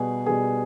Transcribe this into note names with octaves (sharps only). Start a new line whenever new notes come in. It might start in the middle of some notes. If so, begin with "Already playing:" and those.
Already playing: B2 G3 B3 G#4
B2 G3 B3 G#4